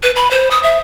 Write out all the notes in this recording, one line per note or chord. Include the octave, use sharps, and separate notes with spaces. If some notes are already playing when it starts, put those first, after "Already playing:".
B4
B5
C5
D#6
E5